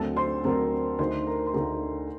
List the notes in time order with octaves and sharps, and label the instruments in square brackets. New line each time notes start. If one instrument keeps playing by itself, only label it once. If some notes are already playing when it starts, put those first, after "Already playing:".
Already playing: [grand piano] D2 D3 F#3 C4 [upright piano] A4 A5
[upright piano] C5 C6
[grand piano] D2 D3 F#3 C4 [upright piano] A#4 A#5
[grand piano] D2 D3 A3 D#4 [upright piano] C5 C6
[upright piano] A#4 A#5
C6
[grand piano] D2 D3 A3 D#4 [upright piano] A#4 A#5